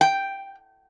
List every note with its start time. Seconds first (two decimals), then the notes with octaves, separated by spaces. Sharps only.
0.01 G5